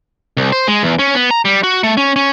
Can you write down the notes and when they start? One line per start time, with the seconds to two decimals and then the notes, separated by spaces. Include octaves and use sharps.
0.37 C2
0.52 C5
0.68 G#3
0.83 E2
0.99 C#4
1.15 B3
1.31 A#5
1.45 G3
1.64 F#4
1.83 A3
1.97 C#4
2.16 C#4